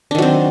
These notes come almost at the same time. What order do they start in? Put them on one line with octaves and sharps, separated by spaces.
D4 D#3 F#3 C4